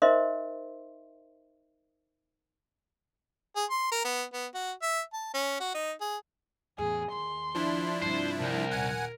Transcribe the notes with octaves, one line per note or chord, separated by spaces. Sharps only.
D#4 A#4 C5 D#5 E5 C6
G#4
C6
A#4
B3
B3
F#4
E5
A5
C#4
F#4
D#4
G#4
E2 A2 G#4
D#2 C6
F3 D4 E4
G2 C3 C5
C2 A#4
D#1 F#5 G#5